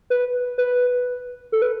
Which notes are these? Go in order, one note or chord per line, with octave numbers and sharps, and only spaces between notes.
B4
B4
A4
B4